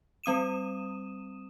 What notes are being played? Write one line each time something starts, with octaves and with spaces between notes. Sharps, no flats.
G3 C4 D#6 D#7 E7